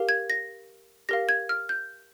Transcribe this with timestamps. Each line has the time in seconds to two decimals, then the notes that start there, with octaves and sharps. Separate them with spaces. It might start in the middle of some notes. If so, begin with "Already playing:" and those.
Already playing: G4 A#4 F5
0.09 G#6
0.30 A#6
1.09 G4 A#4 F5 A#6
1.29 G#6
1.49 F6
1.69 G6